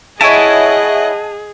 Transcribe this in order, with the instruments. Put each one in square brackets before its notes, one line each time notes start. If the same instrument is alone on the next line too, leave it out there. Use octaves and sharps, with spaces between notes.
[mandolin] E4 C#5 [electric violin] G#4 [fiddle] D#5 F#5 [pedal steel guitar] G#5 A5